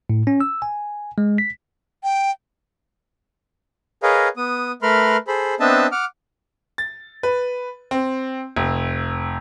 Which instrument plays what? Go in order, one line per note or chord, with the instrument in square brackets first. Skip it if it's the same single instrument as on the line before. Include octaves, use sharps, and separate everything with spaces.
[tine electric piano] A2
C#4
E6
G#5
G#3
B6
[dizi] G5
[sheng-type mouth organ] G#4 A#4 B4 C#5 D#5 F5
B3 D#6
A3 A#4 B4 B5 C6 F6
G#4 A4 C5 B5
B3 C4 D4 D#5 E5 A5
F#5 D6 F6
[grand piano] A6
B4
C4
F1